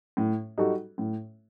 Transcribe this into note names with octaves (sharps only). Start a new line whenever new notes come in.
A2
G3 D#4 F#4 A4
A2